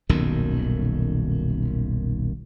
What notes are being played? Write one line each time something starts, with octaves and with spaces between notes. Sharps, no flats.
D#1 B1 F#2 D#3